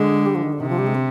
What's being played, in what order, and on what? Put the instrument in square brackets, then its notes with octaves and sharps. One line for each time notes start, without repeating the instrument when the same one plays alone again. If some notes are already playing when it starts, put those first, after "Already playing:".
Already playing: [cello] D3 [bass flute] G#3
[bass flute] G3
F3
D#3
D3
[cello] C3 [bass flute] D#3
[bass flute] F3
G3
G#3
C4